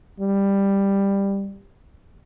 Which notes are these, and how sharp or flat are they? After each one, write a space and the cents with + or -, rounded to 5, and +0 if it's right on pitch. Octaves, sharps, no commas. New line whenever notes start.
G3 +10